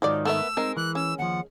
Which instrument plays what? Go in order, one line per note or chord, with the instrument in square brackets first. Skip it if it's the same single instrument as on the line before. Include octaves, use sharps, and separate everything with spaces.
[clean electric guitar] G#2 D#3 D#4 [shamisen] F3 F#3 D5
[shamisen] A3 [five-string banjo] B3 A#4 E5 [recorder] E6
[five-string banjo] G#3 A#4 [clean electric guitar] C4 D#4
[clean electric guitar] E3 [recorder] F#6
[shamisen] C#4 [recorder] E6
[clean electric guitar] D#2 F3 [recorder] F#5